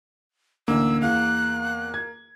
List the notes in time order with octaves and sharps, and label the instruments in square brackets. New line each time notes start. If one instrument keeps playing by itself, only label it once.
[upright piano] A1 D2 [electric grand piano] A#3 [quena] E6
[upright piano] E2 F5 [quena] F#6
[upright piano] G#6